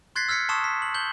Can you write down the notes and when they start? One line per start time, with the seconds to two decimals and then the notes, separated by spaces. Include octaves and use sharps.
0.16 C6 F#6 G#6 A6 B6 C7
0.28 E6 F6 G#6 B6 C#7
0.49 A5 C6 C#6 D#6 E6 E7
0.64 B6
0.82 F#7
0.94 G6 F#7 G7